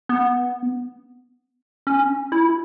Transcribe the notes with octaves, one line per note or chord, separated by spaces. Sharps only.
B3
C#4
E4